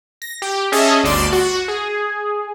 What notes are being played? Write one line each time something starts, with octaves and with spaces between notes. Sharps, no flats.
A#6
G4
C#4 G#4 D#5 E5 A5
G1 D2 D5 C6 D7 E7
F#4
G#4